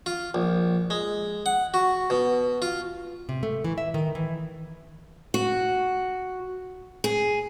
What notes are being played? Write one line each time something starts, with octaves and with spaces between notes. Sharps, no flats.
F4
A#1
G#3
F#5
F#4
B2
F4
C3
A3
E3
E5
D#3
E3
F#4
G#4